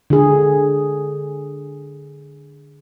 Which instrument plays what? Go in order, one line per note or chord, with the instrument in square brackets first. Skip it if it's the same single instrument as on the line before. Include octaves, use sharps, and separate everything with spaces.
[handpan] D3 G#4